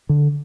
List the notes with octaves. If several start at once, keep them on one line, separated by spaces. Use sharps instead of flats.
D3